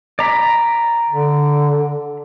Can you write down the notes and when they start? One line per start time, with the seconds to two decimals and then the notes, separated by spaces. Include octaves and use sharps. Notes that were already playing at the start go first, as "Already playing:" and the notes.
0.19 D5 A#5 B5
1.10 D3